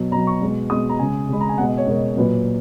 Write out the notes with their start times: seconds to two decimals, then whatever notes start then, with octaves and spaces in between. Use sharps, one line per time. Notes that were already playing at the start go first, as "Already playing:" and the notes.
Already playing: B2 F#3
0.12 B2 F#3 A#5
0.27 C#6
0.42 B2 G#3
0.70 B2 G#3 D#6
0.89 A#5
0.99 C#3 G#3 G#5
1.29 C#3 G#3 B5
1.41 A#5
1.49 G#5
1.58 B2 G#3 F#5
1.68 D#5
1.78 C#5
1.88 B2 G#3 A#4
2.17 A#2 F#3 B4